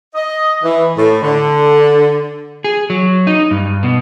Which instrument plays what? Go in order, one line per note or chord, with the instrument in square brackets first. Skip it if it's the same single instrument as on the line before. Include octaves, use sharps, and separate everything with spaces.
[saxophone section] D#5
E3
A2
D3
[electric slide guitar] G#4
F#3
D#4
G2
B2